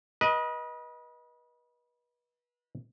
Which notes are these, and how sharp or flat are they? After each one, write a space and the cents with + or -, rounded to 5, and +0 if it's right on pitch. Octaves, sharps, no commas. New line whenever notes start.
B4 -35 D#5 +10